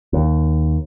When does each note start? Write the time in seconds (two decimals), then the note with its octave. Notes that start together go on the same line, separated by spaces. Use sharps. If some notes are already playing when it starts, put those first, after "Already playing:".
0.13 D#2